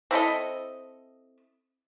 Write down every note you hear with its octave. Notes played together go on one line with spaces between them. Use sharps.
C4 E4 A4 D#5